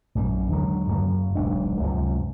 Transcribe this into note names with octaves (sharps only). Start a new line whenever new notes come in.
A#1 F#2 G3
D#2 D3 F#3 G#3
F#2 C#3 F#3 A#3
D#1 B1 G#3 D4
C#2 F#2 C3 F3